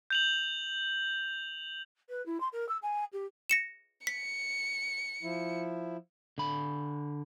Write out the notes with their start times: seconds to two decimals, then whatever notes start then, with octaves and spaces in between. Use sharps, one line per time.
0.10 G6 F7 F#7
2.09 B4
2.25 E4
2.40 C6
2.52 A#4
2.68 E6
2.82 G#5
3.12 G4
3.50 A#6 C#7 E7
4.07 B6 C#7
5.23 F3 E4
6.38 D3 B5